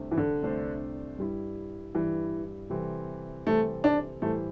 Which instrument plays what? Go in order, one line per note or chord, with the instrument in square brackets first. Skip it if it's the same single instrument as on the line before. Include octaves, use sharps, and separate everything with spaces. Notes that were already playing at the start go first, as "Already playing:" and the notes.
Already playing: [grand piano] C2 C3 A3 D4 C5
[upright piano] E3
D3
[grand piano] C2 C3 A3 D4 C5
G2 G3 E4
[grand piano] G2 G3 E4 [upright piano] E3
[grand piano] C3 E3 G3 C4 A4
[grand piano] C3 E3 G3 C4 A4 [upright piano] A3
[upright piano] D4
[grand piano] A2 E3 G3 E4 C5 [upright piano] A3